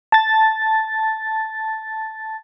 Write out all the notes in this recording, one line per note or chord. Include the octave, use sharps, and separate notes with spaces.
A5 A6